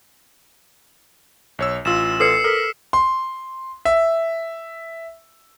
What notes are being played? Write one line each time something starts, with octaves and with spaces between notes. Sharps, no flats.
B1 C#5 E6
A1 F4 E6 E7
A4 B4 D5 E6 C7 C#7
A4 A#4 F6 B6
C6
E5